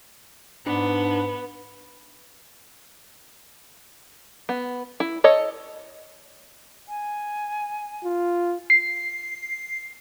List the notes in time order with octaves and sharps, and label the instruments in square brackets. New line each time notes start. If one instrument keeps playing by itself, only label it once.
[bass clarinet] G#2 [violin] B3 [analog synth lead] D4 [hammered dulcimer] B4
[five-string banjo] B3
E4
A4 C#5 D#5
[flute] G#5
[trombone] F4
[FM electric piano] C7